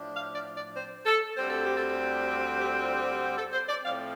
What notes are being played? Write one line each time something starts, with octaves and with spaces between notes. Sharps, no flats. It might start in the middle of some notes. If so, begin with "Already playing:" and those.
Already playing: A2 F3 D4
F5
D5
D5
C5
A4
D2 D3 G3 C4 C5
A4
G4
A4
G4
F4
G4
C5
A4
C5
D5
A2 F3 C4 F5